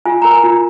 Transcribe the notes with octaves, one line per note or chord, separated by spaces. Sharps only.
F4 G#5
A#4 A#5
G#5
F4